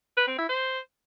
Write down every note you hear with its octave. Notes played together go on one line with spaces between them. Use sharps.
B4
C4
E4
C5